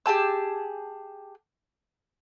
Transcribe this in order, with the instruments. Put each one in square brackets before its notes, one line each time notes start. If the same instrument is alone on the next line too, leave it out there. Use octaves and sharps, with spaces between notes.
[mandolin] G4 G#4 A5 E6